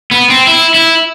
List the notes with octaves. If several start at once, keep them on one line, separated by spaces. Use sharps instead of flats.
B3
C4
E4
E4